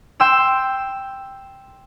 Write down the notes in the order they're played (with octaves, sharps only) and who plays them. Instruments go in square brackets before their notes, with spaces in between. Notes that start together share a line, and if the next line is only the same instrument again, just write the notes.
[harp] G5 C6 E6 E7